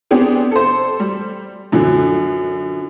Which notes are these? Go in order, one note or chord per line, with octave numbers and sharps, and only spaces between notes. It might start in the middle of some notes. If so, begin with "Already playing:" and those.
B3 C4 D4 G4 G#4
A4 C5
G3
F#2 D3 F3